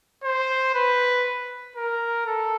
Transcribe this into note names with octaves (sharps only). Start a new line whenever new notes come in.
C5
B4
A#4
A4